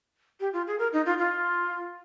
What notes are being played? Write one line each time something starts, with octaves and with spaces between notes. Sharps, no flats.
G4
F4
G#4
A#4
D#4
F4
F4